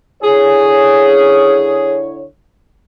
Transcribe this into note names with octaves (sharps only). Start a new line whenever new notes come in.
D3 E4 G#4 C#5